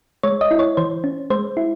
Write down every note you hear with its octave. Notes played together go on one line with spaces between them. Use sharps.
G#3 C#5
D#5
E4
C#5
E3 C5
C#4
G#3 C5
E4